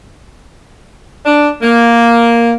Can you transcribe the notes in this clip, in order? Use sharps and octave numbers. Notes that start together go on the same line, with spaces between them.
D4
A#3